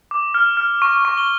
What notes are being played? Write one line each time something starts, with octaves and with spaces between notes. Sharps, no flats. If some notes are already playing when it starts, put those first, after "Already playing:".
D6
F6
F6
C#6
C#6
G7